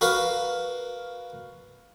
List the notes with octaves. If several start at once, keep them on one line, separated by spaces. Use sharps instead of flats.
F#4 A#4 B4 F5